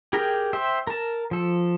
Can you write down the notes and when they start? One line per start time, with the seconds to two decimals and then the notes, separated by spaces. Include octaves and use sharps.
0.13 G4 G#4 A#4 G5 A#5
0.53 C5 E5 G5
0.87 A#4 A5
1.31 F3 A4